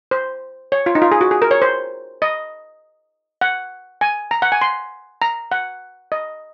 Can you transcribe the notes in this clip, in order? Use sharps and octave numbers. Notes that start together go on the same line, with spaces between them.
C5
C#5
F4
D#4
F4
G#4
F#4
G#4
A#4
C#5
C5
D#5
F#5
G#5
A#5
F#5
G#5
C6
A#5
F#5
D#5